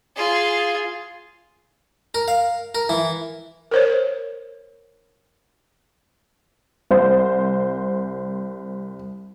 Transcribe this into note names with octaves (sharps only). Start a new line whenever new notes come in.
F4 G#4
A#4
F5
A#4
E3
A#4 C5 C#5
C2 C5